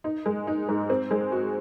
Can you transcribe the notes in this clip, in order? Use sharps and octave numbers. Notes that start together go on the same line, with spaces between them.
D#4
G#3
D#4
G#2
C4
G#3
F#4